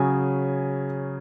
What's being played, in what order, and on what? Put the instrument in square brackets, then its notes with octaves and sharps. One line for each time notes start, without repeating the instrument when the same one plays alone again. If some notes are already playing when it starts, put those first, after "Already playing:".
Already playing: [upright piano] C#3 F#3 C#4 G#4 G#5